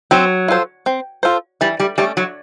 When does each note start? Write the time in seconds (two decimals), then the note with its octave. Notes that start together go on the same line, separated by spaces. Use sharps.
0.11 F#3 C4
0.48 F4 A4 C5
0.86 C4
1.23 F4 A4 C5
1.61 E3 G3
1.80 G3
1.98 G3 A3 C#4
2.17 F#3